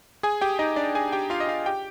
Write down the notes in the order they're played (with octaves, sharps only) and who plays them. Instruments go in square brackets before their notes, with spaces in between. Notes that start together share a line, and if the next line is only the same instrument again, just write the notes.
[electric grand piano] G#4 G#5
G4 G5
D#4 D#5
D4 D5
G#4 G#5
G4 G5
F4 F5
D#5
F4 F5
G4 G5